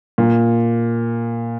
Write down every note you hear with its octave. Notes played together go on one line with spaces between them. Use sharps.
A#2